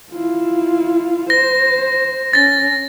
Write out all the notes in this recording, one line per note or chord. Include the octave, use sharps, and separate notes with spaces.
E4 F4
C5 A#6
C#4 A6 A#6